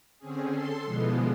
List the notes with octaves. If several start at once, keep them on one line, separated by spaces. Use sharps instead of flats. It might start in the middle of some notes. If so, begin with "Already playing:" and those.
D3 C4 C#4 G#4
A4 C6
B2 D3 E3 F3 G#3 B3